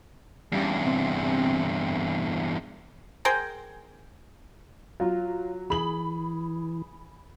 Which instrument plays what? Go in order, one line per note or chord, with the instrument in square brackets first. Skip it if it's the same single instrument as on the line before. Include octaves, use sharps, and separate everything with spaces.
[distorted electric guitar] E2 G2 [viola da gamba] G3 C#4
[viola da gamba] C3 C4
[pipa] G#4 A#4 C5 G5
[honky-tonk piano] F#3 [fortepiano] F4
[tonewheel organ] E3 [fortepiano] G#4 [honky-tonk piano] B5 F#7